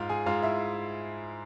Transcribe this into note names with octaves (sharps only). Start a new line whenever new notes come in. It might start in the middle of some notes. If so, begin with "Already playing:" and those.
Already playing: G#2 F4 F5
G#4 G#5
G#2 F4 F5
E4 E5